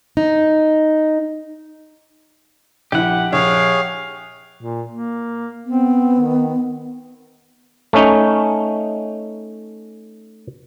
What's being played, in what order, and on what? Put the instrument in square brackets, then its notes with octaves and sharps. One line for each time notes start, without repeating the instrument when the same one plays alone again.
[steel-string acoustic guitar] D#4
[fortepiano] A#1 E4 [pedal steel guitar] G4 F#5
[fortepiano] A#1 [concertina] G#4 C#5 [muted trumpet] F5
[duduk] A#2
A#3
[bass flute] B3 [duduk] C4
[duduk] D#3
[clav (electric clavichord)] A3 C#4 D#4